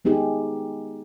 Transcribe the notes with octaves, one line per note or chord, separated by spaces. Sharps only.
G#3 B3 D#4 G4 G#4